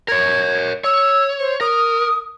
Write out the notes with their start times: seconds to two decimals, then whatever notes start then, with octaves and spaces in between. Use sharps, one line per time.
0.08 A#4 C#5 G#6
0.84 C#5 E6
1.39 C5
1.61 A#4 D#6